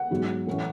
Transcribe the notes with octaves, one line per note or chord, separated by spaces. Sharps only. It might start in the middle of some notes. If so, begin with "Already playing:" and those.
Already playing: F#5
G#2 F#3 B3
A2 E3 A3 C#4